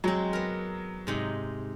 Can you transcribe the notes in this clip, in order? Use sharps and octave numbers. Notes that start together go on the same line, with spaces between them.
F#3 G#3 C4
B3 A#4
G#2 C3 D#4